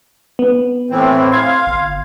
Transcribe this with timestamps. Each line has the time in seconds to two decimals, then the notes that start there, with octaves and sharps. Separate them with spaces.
0.39 B3
0.90 A2 E3 C4
1.32 F5 C6 G#6
1.66 G1